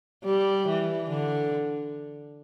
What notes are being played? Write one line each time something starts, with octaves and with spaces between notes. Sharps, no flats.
G3
E3
D3